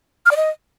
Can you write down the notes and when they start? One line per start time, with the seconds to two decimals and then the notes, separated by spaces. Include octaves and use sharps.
0.26 F6
0.31 D5
0.37 D#5